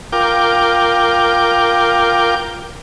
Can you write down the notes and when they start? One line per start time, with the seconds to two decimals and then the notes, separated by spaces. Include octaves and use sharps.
0.12 F4 A#4 G5 D6